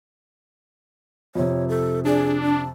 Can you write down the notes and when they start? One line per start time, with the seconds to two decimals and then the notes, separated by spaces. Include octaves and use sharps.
1.35 F2 C3 C#5
1.69 A4
2.05 D4 G#4
2.43 A5